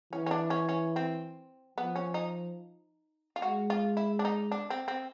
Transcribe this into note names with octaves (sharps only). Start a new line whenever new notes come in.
E3 C#4
C#4
D4
C#4
C#4
C4
F3 B3
C#4
D#4
F4
G#3 F#4
F4
E4
D4
D#4
D4
C4
C4